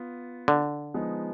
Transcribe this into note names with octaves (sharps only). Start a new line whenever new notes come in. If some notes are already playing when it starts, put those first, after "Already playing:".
Already playing: B3 F4
D3
F3 G#3 B3 D#4